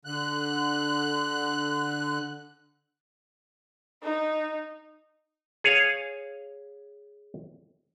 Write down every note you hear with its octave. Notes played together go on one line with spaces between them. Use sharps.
D3 F#6
D#4
G#4 C#5 F5